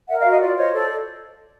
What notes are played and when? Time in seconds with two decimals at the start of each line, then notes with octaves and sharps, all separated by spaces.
0.09 A#4 E5 F#5
0.19 D#5 F5
0.25 F#4
0.31 D#5
0.40 F4 D5
0.57 C5 C#5 D#5
0.72 A4 D5